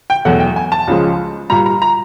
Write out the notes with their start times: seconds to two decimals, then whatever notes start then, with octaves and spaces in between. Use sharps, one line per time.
0.10 G5
0.25 E2 B2 F#3 A3 F#5
0.40 G5
0.56 G#5
0.72 A5
0.87 C#2 C#3 F3 G#3
1.50 A#2 G3 A#5
1.66 A#5
1.82 A#5